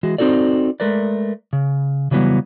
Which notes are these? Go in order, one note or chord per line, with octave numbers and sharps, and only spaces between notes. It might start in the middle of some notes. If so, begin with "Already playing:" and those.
E3 G#3 F#4
C4 D#4 F#4 A4 D5
G#3 A3 A#4 B4 D5
C#3
C#3 E3 F#3 G3 B3